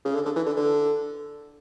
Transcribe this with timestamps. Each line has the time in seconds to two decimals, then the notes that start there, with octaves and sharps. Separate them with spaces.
0.05 C#3
0.15 D3
0.25 D3
0.36 E3
0.46 D3
0.56 D3